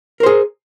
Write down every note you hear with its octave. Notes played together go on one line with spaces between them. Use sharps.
G#4 A#4 C5